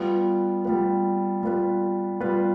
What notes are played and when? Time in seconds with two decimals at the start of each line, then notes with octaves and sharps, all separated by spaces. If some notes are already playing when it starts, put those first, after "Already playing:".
Already playing: G3 B3 F4 B4
0.65 G3 B3 F4 B4
1.43 G3 B3 F4 B4
2.20 G3 B3 F4 B4